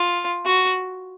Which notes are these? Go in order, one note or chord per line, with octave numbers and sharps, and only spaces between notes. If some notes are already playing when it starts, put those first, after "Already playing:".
Already playing: F4
F#4